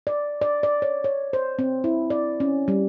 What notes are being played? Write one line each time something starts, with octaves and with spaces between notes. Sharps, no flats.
D5
D5
D5
C#5
C#5
C5
C4
E4
D5
C#4
G3